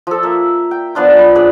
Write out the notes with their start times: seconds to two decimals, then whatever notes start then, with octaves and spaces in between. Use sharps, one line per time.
0.07 F3 A4
0.23 A#3 E5
0.71 G5
0.95 F3 B3 D4 F4
1.16 C#5 B5
1.35 D4 G#4 B4 D5